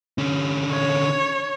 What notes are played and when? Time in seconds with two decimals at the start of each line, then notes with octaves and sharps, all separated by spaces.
0.18 D3 C#4
0.71 C#5